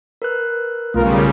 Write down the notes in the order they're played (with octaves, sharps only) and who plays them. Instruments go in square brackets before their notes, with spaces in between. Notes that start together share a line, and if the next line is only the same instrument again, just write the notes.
[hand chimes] A#4 B4 F#6
[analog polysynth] B1 F4 A#4 [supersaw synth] C#3 G3 [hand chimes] A3